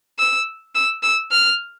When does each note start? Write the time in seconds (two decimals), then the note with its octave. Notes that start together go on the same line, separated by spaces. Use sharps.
0.19 E6
0.75 E6
1.03 E6
1.31 F6